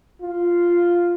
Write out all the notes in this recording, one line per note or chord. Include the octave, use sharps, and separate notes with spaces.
F4